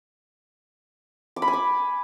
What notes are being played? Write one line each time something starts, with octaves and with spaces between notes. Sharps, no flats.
D6
B5
G#5
D6